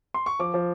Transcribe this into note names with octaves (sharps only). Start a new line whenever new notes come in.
C6
C#6
F3 D6
F3